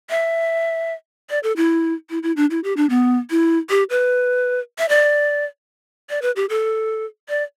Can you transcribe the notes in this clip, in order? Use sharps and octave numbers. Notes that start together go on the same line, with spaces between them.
E5
D5
A4
E4
E4
E4
D4
E4
G4
D4
B3
E4
G4
B4
E5
D5
D5
B4
G4
A4
D5